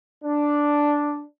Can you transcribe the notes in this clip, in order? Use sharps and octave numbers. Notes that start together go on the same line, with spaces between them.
D4